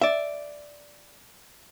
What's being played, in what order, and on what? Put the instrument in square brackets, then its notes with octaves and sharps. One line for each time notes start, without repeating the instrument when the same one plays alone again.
[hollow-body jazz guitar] D5 E5